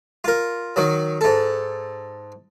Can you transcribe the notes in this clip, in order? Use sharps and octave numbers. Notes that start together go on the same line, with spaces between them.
F4 A#4
D#3 F#3
G#2 A4